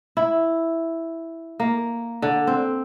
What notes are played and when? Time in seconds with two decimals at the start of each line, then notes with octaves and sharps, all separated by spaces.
0.17 E4
1.60 A#3
2.22 D3
2.47 C4